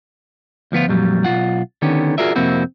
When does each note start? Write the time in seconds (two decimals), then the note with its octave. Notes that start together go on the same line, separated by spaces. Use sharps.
0.72 D2 F3 B3 F4
0.88 F2 A#2 F#3 G3
1.24 B1 F2 F4 F#5
1.82 D3 D#3 B3 C#4 G4
2.18 F4 F#4 G#4 A#4 D5 E5
2.36 F2 C3 A#3 C4 E4 F#4